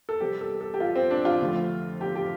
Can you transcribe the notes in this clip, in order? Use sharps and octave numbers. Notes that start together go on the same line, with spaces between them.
A4
C3 G3 G4
A4
A4
G4
F4
C4
D4
F4
F2 D3 A3
G4
G4